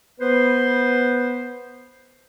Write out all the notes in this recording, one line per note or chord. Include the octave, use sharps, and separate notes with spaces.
B3 B4 C5